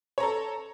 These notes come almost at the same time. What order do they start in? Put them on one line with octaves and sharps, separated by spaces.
C#5 A#5 A4